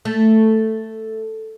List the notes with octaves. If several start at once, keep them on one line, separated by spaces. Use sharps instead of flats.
A3